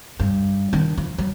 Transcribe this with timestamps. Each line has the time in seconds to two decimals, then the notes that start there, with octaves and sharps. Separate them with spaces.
0.19 G2
0.73 D#3 D4
0.97 F3
1.18 F#3